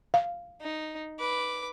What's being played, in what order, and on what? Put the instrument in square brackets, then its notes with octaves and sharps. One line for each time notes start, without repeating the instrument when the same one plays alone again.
[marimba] F5
[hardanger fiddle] D#4
B4 D6